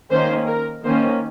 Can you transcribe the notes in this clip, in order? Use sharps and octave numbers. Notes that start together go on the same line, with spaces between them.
D#3 A#3 C#4 C5
A#4
D#3 A#3 C#4 C5